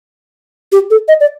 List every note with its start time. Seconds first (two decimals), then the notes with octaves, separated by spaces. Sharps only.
0.72 G4
0.91 A4
1.08 D#5
1.21 D5